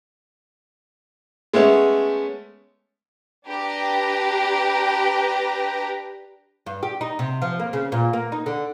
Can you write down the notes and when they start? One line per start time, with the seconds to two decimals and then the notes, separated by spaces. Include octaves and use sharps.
1.54 G#3 A3 B3 C#4
3.48 D4 G4 B4 A#5
6.66 G2
6.83 G4
7.01 D#4
7.19 C3
7.42 F3
7.59 A#3
7.73 C#3
7.92 A#2
8.13 A#3
8.32 D#4
8.46 D3